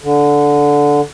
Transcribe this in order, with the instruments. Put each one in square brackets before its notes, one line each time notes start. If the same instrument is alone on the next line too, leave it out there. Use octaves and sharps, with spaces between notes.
[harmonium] D3